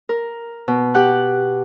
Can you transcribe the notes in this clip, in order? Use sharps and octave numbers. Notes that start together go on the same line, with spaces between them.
A#4
B2
G4 F#5 F#6